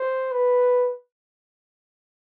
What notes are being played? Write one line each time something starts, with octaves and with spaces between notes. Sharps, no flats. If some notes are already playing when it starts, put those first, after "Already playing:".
Already playing: C5
B4